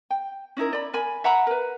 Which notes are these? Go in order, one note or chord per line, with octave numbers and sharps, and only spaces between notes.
G5
C#4 D#4 E4 A#4
D5 B5
A#4 G#5 B5
E5 F#5 A#5 B5
A#4 B4